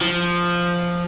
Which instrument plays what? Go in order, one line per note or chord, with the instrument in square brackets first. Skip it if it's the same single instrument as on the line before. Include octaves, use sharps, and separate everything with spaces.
[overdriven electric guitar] F3